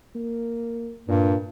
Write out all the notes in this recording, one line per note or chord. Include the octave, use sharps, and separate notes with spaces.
A#3
G2 A#2